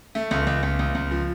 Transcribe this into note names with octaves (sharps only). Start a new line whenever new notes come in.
A3
C#2
C#2
C#2
C#2
C#2
F3